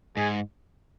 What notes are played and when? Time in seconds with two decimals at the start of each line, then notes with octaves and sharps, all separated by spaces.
0.17 G#2 G#4